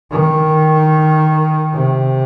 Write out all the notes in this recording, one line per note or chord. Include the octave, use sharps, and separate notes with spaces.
D#3
C3